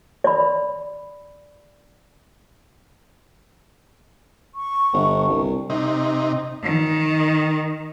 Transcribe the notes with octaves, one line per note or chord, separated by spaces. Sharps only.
D5 B5
C#6
G1
C2
C3 D#4
D#3